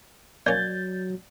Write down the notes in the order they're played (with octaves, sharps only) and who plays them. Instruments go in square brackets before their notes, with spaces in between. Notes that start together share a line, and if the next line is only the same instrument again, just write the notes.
[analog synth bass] F#3 [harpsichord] A#3 C#4 [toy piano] D5 [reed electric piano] G6 A6